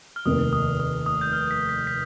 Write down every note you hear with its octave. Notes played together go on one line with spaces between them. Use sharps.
F6
F1 D#2 D#3 D#6
D#6
D#6
D#6
G6
F6
B6
B6
B6